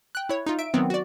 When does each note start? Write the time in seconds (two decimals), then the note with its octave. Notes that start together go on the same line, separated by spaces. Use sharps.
0.15 G5 F#6
0.29 E4 C#5
0.46 D#4 F4
0.59 E5 D7
0.74 D#3 F#3 B3 C4
0.90 F#4 D5